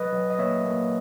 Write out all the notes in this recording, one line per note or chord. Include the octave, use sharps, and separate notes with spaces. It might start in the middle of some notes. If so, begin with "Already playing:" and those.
Already playing: F#3 B4 D#5
F#3
D#5
A#3 C#5 E5
A#3